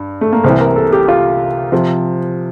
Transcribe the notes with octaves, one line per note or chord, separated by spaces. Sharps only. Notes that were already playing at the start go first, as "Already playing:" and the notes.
Already playing: G2
A3
A#3
C2 C3 E3 C4
A#4
A4
G4
F4
C3 F3